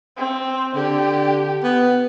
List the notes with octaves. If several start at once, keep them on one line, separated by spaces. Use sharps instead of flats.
C4
D3 G4
B3